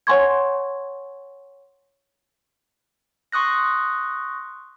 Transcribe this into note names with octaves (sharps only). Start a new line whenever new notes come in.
C#5 F#5 G#5 C6 C#6 G#6
C6 C#6 D#6 F#6 A#6